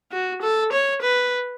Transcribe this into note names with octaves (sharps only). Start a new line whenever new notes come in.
F#4
A4
C#5
B4